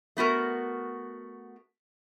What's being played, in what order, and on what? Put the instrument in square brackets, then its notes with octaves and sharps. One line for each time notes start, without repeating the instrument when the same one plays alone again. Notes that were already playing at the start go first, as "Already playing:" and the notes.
[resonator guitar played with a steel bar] A3 B3 F#4 A#4